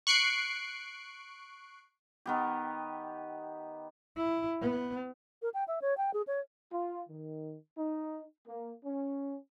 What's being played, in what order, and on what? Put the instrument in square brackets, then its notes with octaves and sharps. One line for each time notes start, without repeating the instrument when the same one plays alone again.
[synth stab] C#6 F#6 C7 D7
[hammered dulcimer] D#3 B3 G4
[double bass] E4
B3
[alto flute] A#4
G5
E5
C#5
G5
G#4
C#5
[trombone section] F4
D#3
D#4
A#3
C#4